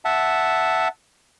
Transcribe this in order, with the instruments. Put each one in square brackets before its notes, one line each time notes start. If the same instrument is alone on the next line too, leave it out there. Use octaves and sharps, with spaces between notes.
[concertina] E5 F#5 A5